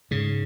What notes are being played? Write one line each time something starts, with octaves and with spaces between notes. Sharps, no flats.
G#2 C#3